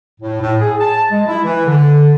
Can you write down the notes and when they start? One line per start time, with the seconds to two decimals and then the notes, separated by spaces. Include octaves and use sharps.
0.21 A2
0.41 A2
0.60 G#4
0.80 A5
1.11 G#3
1.27 E4
1.45 E3
1.67 D3